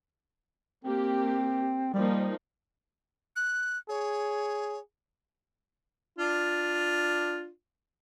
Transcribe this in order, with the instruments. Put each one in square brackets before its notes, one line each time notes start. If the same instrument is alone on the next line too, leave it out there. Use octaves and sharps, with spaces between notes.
[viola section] A#3 G4 [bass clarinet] C4
[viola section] F3 A#3 D#4 [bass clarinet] G3
[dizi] F#6
[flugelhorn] G#4 [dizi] C#5
[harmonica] D4 F4